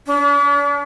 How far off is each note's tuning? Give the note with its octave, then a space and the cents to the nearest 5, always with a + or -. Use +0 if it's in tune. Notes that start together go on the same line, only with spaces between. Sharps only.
D4 -45